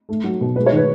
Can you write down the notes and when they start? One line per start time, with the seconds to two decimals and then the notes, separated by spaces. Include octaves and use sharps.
0.09 A3
0.24 F#3
0.41 B2
0.56 G#3 B4
0.66 C#5
0.72 D#3 B4